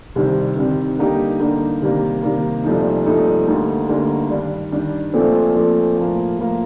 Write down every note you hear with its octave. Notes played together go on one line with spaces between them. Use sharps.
C2 C3 D#3 G3 C4
C2 C3 D#3 G3 C4
D3 G3 A#3 D#4 G4
D3 G3 A#3 D#4 G4
C3 D#3 G3 A#3
C3 D#3 G3 A#3
C2 A#2 F3 A3 D#4
C2 A#2 F3 A3 D#4
D2 D3 G3 A#3 D#4
D2 D3 G3 A#3 D#4
G2 D#3 G3 D4
G2 D#3 G3 D4
A#2 F3 A3 C4
A#2 F3 A3 C4
A2 F3 A#3
A2 F3 A#3